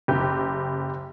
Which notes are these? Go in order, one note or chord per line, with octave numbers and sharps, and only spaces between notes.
F#1 G4